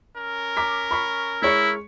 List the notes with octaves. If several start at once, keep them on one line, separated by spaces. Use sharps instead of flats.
C#4 A#4
A#5 D6 B6
B5 C#6 B6
G#3 E4 C#5 C#7